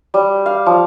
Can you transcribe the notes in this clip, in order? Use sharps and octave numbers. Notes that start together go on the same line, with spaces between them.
G3
F5
F3